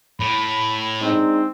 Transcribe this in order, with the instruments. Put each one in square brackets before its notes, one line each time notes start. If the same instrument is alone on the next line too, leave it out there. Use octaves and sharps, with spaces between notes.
[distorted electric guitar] A2 [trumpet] B5
[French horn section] G#3 D4 D#4 [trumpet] C4